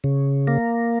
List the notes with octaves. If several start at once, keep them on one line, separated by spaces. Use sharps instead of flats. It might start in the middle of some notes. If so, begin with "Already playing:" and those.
C#3
A#3